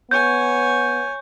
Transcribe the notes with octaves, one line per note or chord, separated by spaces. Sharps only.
B3 C#5 G#5 G6